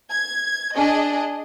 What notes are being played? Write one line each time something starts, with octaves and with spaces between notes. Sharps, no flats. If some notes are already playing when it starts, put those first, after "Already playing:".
G#6
D4 G#4 D#5